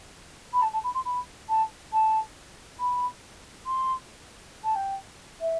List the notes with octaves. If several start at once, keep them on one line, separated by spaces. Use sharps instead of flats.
B5
A5
A5
B5
C6
B5
A5
A5
B5
C6
A5
G5
E5